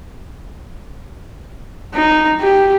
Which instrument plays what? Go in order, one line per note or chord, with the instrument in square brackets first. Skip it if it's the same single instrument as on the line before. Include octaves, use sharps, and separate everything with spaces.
[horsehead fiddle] D#4
G4